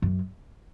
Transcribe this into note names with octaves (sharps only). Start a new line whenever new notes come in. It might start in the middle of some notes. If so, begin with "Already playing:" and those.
F#2